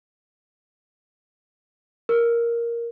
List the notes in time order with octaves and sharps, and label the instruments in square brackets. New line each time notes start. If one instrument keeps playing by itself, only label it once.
[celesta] A#4